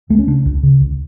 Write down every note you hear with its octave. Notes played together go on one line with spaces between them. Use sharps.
C#2 A3
C#4
C#3 D4
C#2
C#3
C#2